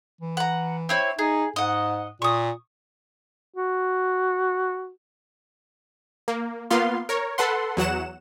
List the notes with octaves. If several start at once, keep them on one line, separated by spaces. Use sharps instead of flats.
E3
F#5 A#5
C4 E4 C#5
D#4 G#4
G#2 D#5 F#5
A#2 C#6 D#6
F#4
A#3
A#3 B3 F4 F5 C6
A#4 C#5
A4 B4 F#5 C6
E2 F#3 F#5 E7